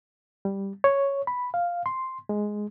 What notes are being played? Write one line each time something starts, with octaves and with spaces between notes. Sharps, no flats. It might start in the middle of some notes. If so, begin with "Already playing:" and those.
G3
C#5
B5
F5
C6
G#3